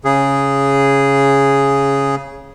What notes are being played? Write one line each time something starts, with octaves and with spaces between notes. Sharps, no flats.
C#3 G#4